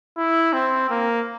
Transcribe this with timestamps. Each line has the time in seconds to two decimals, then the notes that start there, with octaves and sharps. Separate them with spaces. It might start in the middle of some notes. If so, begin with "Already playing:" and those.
0.17 E4
0.53 C4
0.90 A#3